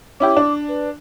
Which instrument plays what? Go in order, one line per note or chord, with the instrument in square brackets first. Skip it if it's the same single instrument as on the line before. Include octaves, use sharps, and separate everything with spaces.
[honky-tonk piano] C#4 E4 G4 [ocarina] D6
[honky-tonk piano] D4
[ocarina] B4